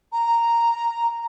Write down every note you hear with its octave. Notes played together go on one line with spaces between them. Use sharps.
A#5